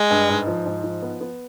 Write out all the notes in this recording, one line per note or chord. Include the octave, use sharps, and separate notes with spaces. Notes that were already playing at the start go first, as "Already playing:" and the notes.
Already playing: G#3
G2
G#2
F3
G#2
F3
B3
B3